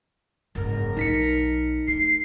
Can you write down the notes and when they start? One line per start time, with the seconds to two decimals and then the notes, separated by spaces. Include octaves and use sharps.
0.55 F#1 G#2 A#4
0.97 B1 D#4 B6 C#7
1.88 A3 C7